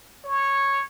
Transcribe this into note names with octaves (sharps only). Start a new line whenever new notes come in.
C#5